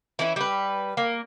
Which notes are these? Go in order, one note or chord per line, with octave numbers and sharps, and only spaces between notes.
E3 C#4 E4
G3 B4
A#3